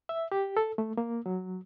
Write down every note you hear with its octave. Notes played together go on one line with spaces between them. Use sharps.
E5
G4
A4
A3
A#3
F#3